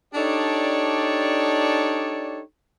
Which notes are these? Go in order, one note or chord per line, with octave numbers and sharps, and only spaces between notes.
D4 D#4 G4 A4 C#5 D5